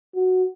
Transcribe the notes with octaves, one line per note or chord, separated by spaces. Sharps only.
F#4